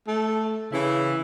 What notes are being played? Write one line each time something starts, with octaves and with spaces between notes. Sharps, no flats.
A3
C#3 E3 E4